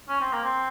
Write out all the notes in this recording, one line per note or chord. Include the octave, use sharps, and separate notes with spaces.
C#4
C4
A#3
C4